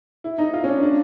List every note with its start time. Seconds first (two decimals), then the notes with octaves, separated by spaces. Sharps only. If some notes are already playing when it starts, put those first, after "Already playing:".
0.24 E4
0.38 D#4
0.53 F4
0.64 C#4
0.67 D4
0.83 D4